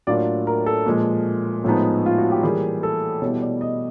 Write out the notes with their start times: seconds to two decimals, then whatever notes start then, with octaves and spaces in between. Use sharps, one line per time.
0.07 A2 F#3 A#3 D4 F4 D5
0.47 A#4
0.66 A4
0.86 A#2 F3 G#3
1.64 A2 F3 G#3 B3 D#4
2.06 F4
2.18 F#4
2.31 G4
2.43 E3 G3 A#3 G#4
2.83 A4
3.21 B2 G3 B3 E4 C#5
3.42 D5
3.61 D#5